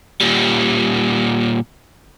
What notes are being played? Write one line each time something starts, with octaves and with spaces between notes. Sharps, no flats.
A#2 G3